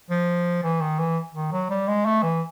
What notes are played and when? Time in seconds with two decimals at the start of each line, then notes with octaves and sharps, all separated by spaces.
0.10 F3
0.63 E3
0.81 D#3
0.99 E3
1.35 D#3
1.52 F#3
1.70 G3
1.88 G#3
2.06 A3
2.23 E3